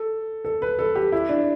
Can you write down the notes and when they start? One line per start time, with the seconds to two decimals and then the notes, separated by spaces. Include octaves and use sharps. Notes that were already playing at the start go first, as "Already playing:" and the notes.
Already playing: A4
0.45 A4
0.62 B4
0.79 A4
0.96 G4
1.12 E4
1.29 D4